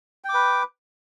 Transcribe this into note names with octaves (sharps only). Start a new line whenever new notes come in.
B4 G5 D6